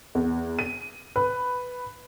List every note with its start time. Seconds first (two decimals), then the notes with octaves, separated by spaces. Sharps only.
0.15 E2
0.59 D#7
1.16 B4